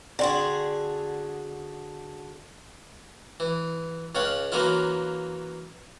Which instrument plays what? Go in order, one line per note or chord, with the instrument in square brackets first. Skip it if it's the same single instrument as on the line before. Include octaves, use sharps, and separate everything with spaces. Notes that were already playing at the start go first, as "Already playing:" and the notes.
[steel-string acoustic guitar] D3 F#4 G#4 [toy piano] D5 G5 C6
[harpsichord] E3
C#2 C#3 C#5 F5 F#5
E3 F#3 A#3 C#4 E4 F4